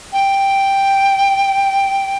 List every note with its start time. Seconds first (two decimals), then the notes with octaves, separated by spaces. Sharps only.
0.13 G5